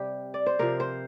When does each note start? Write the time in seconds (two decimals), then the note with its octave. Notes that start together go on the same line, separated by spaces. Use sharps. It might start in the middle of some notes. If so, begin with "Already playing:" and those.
Already playing: C3 G3 G4
0.34 D5
0.46 C5
0.59 C3 F3 A#4
0.80 C5